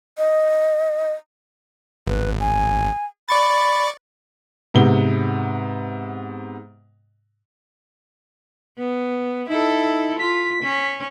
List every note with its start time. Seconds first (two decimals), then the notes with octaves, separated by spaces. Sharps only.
0.18 D#5
2.07 G#1 B4
2.40 G#5
3.29 D5 B5 C#6 A6
4.74 G#2 C3 B3 G7
8.78 B3
9.49 D#4 E4 A4
10.19 F4 B6
10.63 C#4